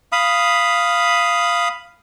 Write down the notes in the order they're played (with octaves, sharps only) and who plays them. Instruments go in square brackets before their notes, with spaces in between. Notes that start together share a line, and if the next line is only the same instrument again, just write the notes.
[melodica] F5 B5 D#6